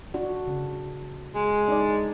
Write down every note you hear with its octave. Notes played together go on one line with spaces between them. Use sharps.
D4 F#4
C#3
G#3
D4 D#4 D5